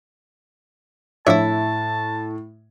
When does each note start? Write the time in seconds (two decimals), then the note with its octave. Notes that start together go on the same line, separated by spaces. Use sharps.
1.27 A2 F3 D4 E4 C#5 E5 A5